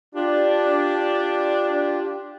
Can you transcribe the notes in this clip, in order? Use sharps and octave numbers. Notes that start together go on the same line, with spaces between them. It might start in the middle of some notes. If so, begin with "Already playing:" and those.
D4 F4 G4